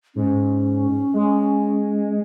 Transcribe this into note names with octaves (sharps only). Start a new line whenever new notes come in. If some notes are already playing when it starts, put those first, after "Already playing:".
G#2 C#4
G#3